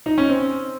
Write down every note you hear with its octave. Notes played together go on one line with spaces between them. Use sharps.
D#4
C#4
C4